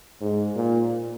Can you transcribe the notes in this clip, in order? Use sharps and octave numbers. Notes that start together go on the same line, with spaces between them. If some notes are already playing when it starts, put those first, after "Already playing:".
G#2
A#2